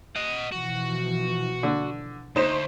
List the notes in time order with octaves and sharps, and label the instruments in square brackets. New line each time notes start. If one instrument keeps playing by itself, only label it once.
[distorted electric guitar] D#5 F#5
[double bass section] B2 E3 F3 [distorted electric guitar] F#4
[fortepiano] D3
[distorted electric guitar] D2 [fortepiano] D#4 [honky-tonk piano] C5 E7